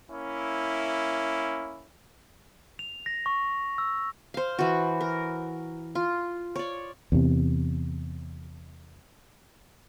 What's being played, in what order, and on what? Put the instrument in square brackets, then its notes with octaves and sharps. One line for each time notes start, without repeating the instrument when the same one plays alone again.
[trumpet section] A#3 C#4 E4
[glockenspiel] F7
A#6
C#6
E6
[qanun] C5 F5
E3 F#4
A#4
F4
C#5 D5
[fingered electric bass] E2 C3